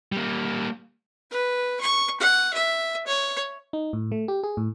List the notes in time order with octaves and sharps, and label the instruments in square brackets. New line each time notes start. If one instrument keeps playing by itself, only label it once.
[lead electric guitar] G3 A#3
[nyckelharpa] B4
C#6
F#5
E5
C#5
[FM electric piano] D#4
A2
A3
G4
G#4
A2